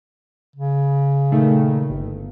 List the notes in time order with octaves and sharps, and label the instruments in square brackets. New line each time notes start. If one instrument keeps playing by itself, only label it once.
[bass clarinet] C#3
[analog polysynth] A#2 D#3 A3
G1